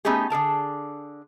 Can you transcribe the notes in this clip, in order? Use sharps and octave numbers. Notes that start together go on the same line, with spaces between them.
A3 B3 C#4 D#4 G4 G#4
D3 G#4 A#4 A5